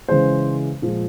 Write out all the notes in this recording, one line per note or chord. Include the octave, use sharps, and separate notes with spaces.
C#3 E3 G#3 C5
A#2 F3 G#3